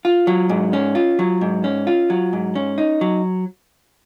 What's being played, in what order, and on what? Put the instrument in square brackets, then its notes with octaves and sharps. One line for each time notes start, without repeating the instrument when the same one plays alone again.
[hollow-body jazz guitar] F4
F#3
G#2
C#4
F4
F#3
G#2
C#4
F4
F#3
G#2
C#4
D#4
F#3